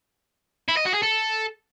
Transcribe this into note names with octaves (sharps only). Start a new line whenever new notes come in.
E4
D#5
F#4
G#4
A4